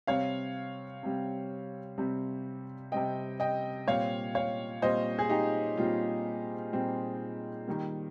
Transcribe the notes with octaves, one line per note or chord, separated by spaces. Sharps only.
C3 G3 C4 C#5 F5
C3 G3 C4
C3 G3 C4
C3 G3 C4 D#5 G5
D#5 G5
A#2 G3 C4 C#5 F5
C#5 F5
A#2 G3 C4 C5 D#5
G#4
D#4 G4
A#2 G3 C4 F4
A#2 G3 C4
D#3 G3 A#3